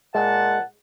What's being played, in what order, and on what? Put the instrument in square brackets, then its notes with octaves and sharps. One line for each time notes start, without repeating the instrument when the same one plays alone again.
[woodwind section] A#2 A5 [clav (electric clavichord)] G#3 [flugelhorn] F#5